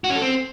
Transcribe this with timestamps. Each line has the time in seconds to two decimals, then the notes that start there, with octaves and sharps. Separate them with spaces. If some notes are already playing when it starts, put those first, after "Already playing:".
0.04 F#4
0.10 C#4
0.16 A4
0.22 C4